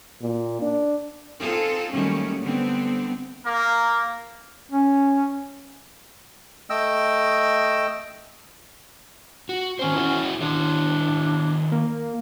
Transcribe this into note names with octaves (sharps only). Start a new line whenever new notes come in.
A#2
D4
C4 D#4 F4 G#4 A4
D#3 F#3 G3 A3 A#3 C#4
D3 G3 B3 C4
A#3 A#4
C#4
A3 D#5 G5 E6
F#4
D#3 C4 C#4 C5
E4 F#4 G#4
D#3 D4 E4 C#5
A#3